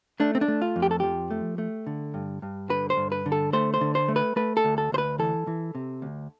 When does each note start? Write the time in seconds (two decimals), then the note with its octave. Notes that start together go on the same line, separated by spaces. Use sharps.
0.20 A3 D4
0.35 C4
0.41 D4
0.48 A3
0.62 F4
0.76 F2
0.82 G4
0.91 A4
1.00 F3 G4
1.31 A3
1.58 A3
1.87 D3
2.14 G2
2.42 G2
2.69 D3 B4
2.90 C5
2.97 G2
3.12 B4
3.26 D3
3.32 A4
3.53 A3 C5
3.74 C5
3.81 D3
3.95 C5
4.08 A3
4.16 B4
4.36 A3 B4
4.57 A4
4.64 D2
4.78 A4
4.92 D2 C5
4.98 B4
5.19 E3 A4
5.47 E3
5.75 C3
6.02 D2